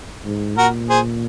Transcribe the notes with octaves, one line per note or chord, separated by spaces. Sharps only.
G#2
A#2 F#4 A#4
G#4 C5